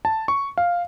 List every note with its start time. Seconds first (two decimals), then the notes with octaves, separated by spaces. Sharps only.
0.05 A5
0.28 C#6
0.58 F5